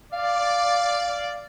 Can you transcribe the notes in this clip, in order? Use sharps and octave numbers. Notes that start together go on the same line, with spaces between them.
D5 F5